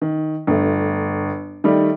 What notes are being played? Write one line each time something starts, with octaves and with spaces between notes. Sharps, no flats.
D#3
G1 A3
D#3 G3 A3